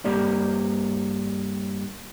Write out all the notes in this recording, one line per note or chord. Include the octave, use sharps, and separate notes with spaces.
G2 A#3 G4 D5